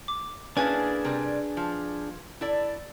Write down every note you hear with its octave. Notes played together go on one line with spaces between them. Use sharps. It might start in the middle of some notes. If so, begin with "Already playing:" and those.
D6
A#3 C#4 D4 E4 G#4 B4 G#5 A5
C3 G3 A#4
F3
E4 A4 D5